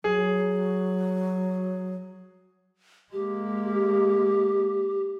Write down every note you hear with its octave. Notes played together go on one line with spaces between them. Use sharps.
F#3 G#4
G#3 A#3 G4